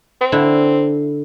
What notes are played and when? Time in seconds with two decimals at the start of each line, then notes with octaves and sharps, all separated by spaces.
0.21 C4
0.32 D3 E4